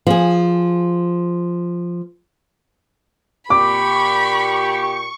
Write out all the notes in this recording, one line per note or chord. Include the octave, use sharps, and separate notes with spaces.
F3 G#4
A#2 G4 B5 C#6 D6